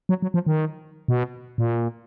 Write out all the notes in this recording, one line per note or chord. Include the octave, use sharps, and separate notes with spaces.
F#3
F#3
F3
D#3
B2
A#2